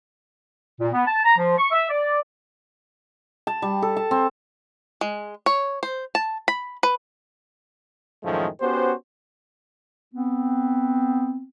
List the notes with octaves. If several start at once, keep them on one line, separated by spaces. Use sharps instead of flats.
A#2
B3
A5
A#5
F3
C#6
E5
D5
A5
G3
A4
A5
C4
G#3
C#5
C5
A5
B5
B4
F#2 A2 D#3 F3 G#3 A3
B3 C#4 F#4 G4 C5
B3 C4